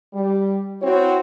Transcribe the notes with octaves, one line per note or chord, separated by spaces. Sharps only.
G3
C4 E4 F#4 C#5